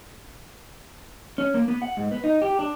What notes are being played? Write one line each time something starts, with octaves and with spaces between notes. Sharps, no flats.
C#4
A#3
B3
F#5
G#2
B3
D#4
G4
D4